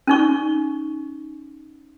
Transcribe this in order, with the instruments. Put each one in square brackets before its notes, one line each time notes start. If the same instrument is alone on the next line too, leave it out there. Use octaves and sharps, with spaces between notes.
[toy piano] C#4 D#4 C#6